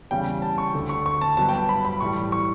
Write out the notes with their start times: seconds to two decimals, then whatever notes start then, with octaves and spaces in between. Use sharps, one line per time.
0.11 E2 C#3 G3 C#4 G5
0.42 A5
0.58 C#6
0.74 D2 D3 A3
0.89 C#6
1.06 C#6
1.21 A5
1.37 G2 F#3 B3 A5
1.49 G5
1.53 A5
1.69 B5
1.85 B5
2.00 A2 E3 G3 C#6
2.32 C#6